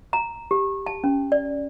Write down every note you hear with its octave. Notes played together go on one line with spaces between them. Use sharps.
A#5
G4
A5
C#4
D5